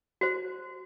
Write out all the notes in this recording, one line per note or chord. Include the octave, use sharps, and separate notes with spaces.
F#4 C5